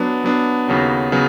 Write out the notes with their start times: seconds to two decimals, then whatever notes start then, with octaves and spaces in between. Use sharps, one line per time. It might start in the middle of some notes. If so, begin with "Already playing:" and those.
Already playing: F#3 B3 D4
0.24 F#3 B3 D4
0.68 D#2 C#3 F#3 B3
1.12 C#3 F#3 B3